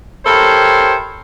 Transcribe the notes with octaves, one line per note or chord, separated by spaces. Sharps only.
E4 G4 A4 A#4 C5 C#5